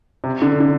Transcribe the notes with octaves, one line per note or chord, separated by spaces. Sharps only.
C3
D3
D3